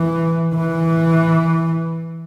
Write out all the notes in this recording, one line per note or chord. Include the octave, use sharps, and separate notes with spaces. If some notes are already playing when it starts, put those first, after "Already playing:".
Already playing: E3
E3